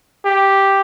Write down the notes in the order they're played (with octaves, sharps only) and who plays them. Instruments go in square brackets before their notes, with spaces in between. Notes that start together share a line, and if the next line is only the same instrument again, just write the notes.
[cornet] G4